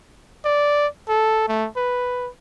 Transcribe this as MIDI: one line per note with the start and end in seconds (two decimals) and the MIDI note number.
0.45 0.87 74
1.09 1.48 69
1.48 1.68 57
1.77 2.29 71